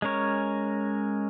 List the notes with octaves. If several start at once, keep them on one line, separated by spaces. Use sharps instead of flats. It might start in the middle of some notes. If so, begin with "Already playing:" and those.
G#3 C#4 A#4 C#5